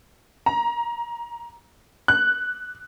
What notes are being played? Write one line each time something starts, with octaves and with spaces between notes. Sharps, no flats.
A#5
F#6